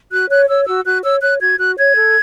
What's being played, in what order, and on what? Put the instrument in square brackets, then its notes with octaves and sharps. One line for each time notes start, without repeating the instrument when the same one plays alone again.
[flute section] F#4 F#6
C#5 F#6
C#5 E6
F#4 E6
F#4 F#6
C#5 E6
C#5 F#6
F#4 G#6
F#4 F#6
C#5 G#6
A4